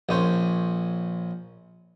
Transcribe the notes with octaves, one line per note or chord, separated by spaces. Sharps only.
A#1 C#4 C5